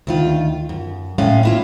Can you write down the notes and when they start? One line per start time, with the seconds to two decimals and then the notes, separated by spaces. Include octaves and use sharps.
0.07 D2 D#3 F4
0.69 F#2
1.18 A2 G#3 C#4 F5
1.43 A#3 E4 F4